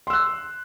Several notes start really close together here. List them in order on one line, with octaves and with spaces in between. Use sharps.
C6 E6 F#6